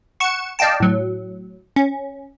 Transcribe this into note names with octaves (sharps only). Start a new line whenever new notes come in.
F#5 C#6 C#7 E7
D5 D#5 F5 G5 A5
A2 F#3
C#4